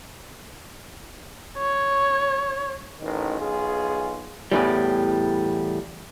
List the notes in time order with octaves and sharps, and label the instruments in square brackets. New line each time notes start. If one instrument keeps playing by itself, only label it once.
[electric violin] C#5
[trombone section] A1 D#3
B1 F4 G#4
[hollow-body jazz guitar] E2 A2 E3 G3